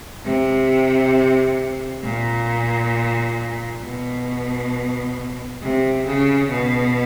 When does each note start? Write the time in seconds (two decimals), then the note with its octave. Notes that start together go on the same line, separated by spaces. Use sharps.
0.24 C3
2.03 A#2
3.82 B2
5.61 C3
6.06 C#3
6.51 B2